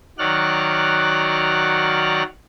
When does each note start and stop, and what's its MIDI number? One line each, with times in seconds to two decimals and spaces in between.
0.19 2.23 51
0.19 2.23 54
0.19 2.23 74
0.19 2.23 78
0.19 2.23 89
0.19 2.23 90